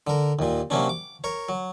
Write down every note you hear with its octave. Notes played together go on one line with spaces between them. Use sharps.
D3 A#4
D#2 A#2
C3 F#3 A#3 C#4 D4
D6
A#4 C#5
F#3